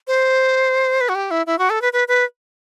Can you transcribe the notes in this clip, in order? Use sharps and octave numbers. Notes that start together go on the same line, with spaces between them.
C5
B4
F#4
G4
E4
E4
F#4
A4
B4
B4
B4